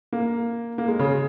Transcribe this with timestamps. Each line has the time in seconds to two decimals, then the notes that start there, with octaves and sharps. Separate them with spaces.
0.13 A#3
0.78 A#3
0.88 G#3
0.99 C#3